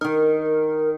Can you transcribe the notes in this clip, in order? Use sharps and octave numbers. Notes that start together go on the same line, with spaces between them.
D#3 D#4 A#4